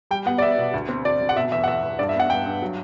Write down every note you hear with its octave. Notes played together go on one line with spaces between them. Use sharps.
G3 G5
B3 F#5
D5
B3 E5
B2
D2
C4
D2 D5
D2
F#5
B2 E5
E2 E5
F#5
E2 E5
E2
G2 D5
E5
B3 F#5
G2 G5
G2
F#3